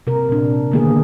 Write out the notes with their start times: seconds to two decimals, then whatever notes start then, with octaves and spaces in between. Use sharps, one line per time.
0.07 C3 A#4
0.29 A#2 D4
0.72 D3 D#3 A#3 B3 G#4